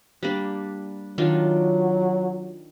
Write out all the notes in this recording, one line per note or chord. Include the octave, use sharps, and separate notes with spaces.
G3 A#3 D4
D#3 F#3 D4 F4